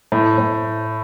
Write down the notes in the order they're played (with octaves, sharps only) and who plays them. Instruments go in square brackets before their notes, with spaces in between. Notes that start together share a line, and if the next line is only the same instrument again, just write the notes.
[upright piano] A2
A2